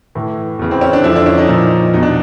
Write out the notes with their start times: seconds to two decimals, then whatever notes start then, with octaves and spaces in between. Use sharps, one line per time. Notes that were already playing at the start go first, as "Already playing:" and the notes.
0.15 A2 E3
0.59 E2 C#3 E3
0.71 C4
0.81 C#4
0.93 D4
1.04 F2 D3 F3 E4
1.16 D4
1.26 C#4
1.38 D#4
1.49 A#2 F3 D#4
1.94 E2 B2 D#4
2.03 D4